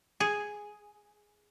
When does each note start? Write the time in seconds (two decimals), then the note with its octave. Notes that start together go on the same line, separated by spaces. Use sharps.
0.20 G#4